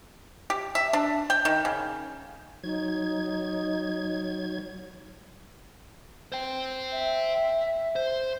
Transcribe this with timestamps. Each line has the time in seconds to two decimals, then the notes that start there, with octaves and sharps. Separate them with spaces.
0.50 G4
0.75 E5
0.93 D4
1.30 G5
1.45 D#3
1.65 C#3
2.64 F#3 D#4 G#6
6.32 C5 G5
6.92 E5
7.96 C5